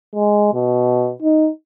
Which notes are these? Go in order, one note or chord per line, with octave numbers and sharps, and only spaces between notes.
G#3
B2
D#4